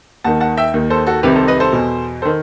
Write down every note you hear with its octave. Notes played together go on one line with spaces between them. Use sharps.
D#2 D#3 F#5 A5
F#5 A5
E5 G5
D#2 D#3
A4 C5
F#4 A4
C2 C3 D#3 G4 B4
A4 C5
B4 D#5
A4 C5
E2 B2
A4 C5
D#3